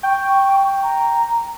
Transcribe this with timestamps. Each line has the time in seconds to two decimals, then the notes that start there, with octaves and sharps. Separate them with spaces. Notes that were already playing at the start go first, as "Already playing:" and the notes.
0.03 G5 C#6
0.83 A#5